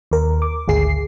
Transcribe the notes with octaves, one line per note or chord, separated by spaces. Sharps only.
D#2 A#4
D6
G#1 D2 G#4 C7